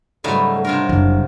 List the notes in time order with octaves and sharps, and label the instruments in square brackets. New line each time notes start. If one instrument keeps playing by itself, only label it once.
[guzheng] G#2 C#3 A3 [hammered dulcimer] F#3 G3 [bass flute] A4
[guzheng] C3 F4 A#4 [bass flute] D4
[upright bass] F#1 [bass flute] D4